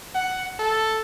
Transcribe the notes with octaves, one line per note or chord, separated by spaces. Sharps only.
F#5
A4